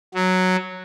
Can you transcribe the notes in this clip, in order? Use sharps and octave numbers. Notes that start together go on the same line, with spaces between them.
F#3